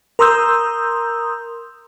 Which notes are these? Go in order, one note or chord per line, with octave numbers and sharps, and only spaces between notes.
A#4 A#5 C6 D#6 E6 G6